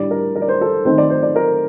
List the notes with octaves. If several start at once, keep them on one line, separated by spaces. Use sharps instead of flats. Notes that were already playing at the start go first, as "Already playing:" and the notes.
Already playing: A2 G3 D4 D5
A#4
A#4
D5
C5
A4
D#3 A3 C4 D#4 C5
D5
C5
D5
A#4